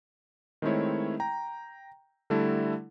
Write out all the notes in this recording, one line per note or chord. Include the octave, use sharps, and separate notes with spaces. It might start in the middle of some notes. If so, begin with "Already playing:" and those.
D#3 G#3 A3 C4 E4 C#5
G5 A#5
D3 G3 A3 E4 A4